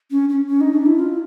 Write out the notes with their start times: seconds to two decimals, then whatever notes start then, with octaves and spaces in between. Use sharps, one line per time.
0.11 C#4
0.29 C#4
0.47 C#4
0.60 D#4
0.73 D4
0.86 E4
0.99 F4